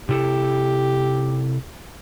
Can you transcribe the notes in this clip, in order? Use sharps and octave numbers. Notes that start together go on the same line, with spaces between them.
C3 E4 G4 A4